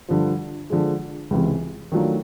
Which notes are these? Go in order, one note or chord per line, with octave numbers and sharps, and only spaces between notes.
G2 D3 F3
D3 F3 G#3
C#2 C3 E3
D#3 F#3 A3 D4 F4